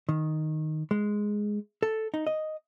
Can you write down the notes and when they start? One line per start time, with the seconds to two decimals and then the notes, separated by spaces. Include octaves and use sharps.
0.09 D#3
0.91 G#3
1.83 A4
2.14 D#4
2.27 D#5